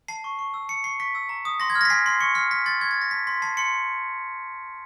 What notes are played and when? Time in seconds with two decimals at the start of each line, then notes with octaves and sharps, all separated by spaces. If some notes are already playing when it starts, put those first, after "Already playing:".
0.08 A5 C7
0.24 C#6
0.39 C#6
0.54 E6
0.69 A5 C#7
0.84 C#6 C7
0.99 C#6 B6
1.15 E6
1.29 A#5
1.45 D#6
1.60 C6 A#6
1.70 G#6
1.75 F6
1.81 A#6 B6
1.90 G#5 C7
2.06 C6 C7
2.21 C#6 C#7
2.35 F6 C7
2.51 G#5 B6
2.66 C6 A6
2.81 C#6 G#6
2.91 A6
2.96 F6
3.01 A#6
3.11 A5 B6
3.27 C6 B6
3.42 A5 C7
3.57 C6 C#7